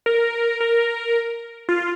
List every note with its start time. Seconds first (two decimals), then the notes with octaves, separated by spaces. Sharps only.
0.06 A#4
0.60 A#4
1.69 F4